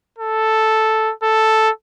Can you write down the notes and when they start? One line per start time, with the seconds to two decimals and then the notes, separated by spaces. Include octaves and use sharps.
0.19 A4
1.23 A4